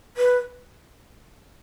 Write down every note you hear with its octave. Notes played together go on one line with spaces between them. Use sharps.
B4